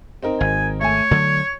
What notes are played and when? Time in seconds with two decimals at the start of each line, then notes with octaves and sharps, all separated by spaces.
0.23 C4 D#4 A#4
0.41 G#1 G#5
0.81 A3 C#5 G#5
1.11 D3 F#3 A3 G#6